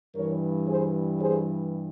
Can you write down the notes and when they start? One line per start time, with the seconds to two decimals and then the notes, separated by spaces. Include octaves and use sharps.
0.15 G2 E3 G3 A#4 C#5
0.67 G#4 C5
1.20 G#4 C5